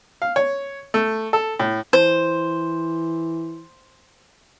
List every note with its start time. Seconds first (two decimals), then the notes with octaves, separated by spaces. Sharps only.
0.22 F5
0.36 C#5
0.94 A3
1.33 A4
1.59 A2
1.93 E3 C5